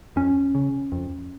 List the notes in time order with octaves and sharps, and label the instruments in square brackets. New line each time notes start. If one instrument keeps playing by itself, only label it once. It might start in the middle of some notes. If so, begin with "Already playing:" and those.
[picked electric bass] F2 C#4
C#3
F2